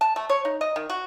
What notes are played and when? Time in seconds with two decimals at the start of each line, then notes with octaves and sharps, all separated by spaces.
0.01 A5
0.16 A3
0.30 C#5
0.45 D#4
0.61 D#5
0.76 D#3
0.90 F#4